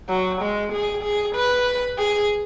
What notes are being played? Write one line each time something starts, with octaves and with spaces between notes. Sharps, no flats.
F#3
G#3
G#4
G#4
B4
G#4